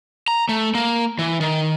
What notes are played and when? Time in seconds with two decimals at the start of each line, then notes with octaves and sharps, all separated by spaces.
0.28 A#5
0.49 A3
0.75 A#3
1.19 E3
1.41 D#3